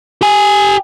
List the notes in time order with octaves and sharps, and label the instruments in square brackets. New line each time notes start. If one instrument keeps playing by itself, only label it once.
[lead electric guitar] G4 G#5